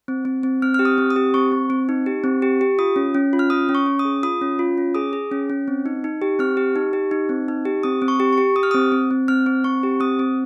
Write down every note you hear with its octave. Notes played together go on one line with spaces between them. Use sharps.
C4
C4
C4
C4 F6
G4 F6
D#6
C4
D#6
G4
C4 C#6
C4
C4
D#4
G4
C4
G4
G4
F4 D#6
C#4
C#4
F4
F6
C#4 D#6
C#4
C#6
C#4
D#6
G#4
F4 D#6
C#4
F4
C#4
G#4 D#6
G#4
C#4
C#4
C4
D#4
D#4
G4
C4 F6
G4
D#4
G4
D#4
C4
D#4
G4
C4 D#6
C4
C#6
G4
C#6
G4
G4 D#6
F6
C4 D#6
C4
C4
C4 F6
C4
C4 C#6
G4
C4 D#6
C4